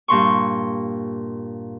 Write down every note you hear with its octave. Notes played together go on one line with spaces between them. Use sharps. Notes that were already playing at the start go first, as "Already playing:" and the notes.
G2 A#2 C6 C#6